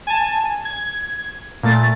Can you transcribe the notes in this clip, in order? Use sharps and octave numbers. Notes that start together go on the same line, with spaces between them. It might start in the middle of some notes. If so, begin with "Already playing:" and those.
G#5 A5
G#6
A#2 A3 A6